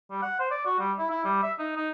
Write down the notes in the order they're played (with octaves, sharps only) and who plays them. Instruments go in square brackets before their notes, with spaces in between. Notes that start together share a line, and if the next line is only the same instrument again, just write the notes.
[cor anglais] G3
F#5
C5
D5
F#4
G3
E4
E4
G3
E5
D#4
D#4